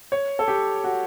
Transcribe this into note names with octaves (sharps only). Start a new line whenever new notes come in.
C#5
A4
G4
F#4